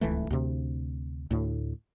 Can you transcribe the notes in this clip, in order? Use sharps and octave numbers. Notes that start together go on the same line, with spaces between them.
D1 C#2 E3 A3
D2 C3
D2 A2